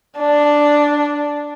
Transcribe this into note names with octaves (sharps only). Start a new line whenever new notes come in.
D4